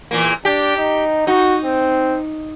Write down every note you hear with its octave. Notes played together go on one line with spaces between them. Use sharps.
E2 A#2 A#3
D4 G4
D#4
D#4 F#4
C4